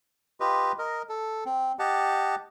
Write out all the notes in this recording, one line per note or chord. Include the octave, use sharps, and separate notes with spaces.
F4 G4 B4 D#5
A#4 D#5
A4
C4
G4 D#5 F#5 A5